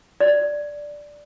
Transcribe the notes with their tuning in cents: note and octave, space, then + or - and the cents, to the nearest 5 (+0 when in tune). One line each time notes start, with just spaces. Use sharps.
D5 +0